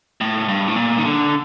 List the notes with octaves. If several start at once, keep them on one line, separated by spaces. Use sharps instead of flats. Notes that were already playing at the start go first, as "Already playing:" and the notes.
A2
G2
A2
A#2
D#3
D3